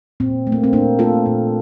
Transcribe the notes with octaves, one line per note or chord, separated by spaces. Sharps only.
A#2 C4
A3
A#3
C4
A#2 A#3 D4
A3 F4 A4
A#2